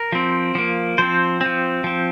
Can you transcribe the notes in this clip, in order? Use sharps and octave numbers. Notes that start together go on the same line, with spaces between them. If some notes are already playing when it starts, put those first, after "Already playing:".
Already playing: A#4
F3 C4
F3 A#3
F3 C4 C5
F3 C4
F3 C4